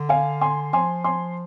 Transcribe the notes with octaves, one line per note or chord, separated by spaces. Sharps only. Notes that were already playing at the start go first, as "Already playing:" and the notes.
Already playing: D3
F5 G#5
G#5 C6
F3 G#5 C6
G#5 C6